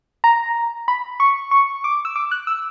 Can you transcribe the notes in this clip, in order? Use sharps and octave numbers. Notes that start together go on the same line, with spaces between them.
A#5
B5
C#6
C#6
D6
E6
D6
F#6
E6